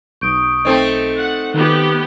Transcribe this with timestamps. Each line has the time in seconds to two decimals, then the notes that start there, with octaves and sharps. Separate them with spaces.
0.21 B1 C#6 D#6 G6 D7
0.65 A3 C4 D#4 A4
1.19 F#5
1.54 D#3 B3 G4